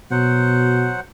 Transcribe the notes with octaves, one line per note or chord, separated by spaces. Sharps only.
B2 F#3 C5 F#5